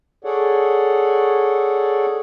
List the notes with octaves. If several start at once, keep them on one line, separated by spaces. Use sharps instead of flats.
G#4 A4 C#5 D5 F#5